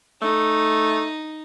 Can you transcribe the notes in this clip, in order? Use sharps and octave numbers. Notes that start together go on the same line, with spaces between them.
A3 D#4